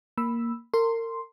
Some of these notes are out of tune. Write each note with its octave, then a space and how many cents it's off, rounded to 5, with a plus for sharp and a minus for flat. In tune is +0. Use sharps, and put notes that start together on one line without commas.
A#3 +0 B5 +0 E6 +0
A#4 -35 C6 +0